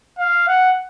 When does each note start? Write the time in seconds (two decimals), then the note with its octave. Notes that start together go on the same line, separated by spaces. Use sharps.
0.18 F5
0.48 F#5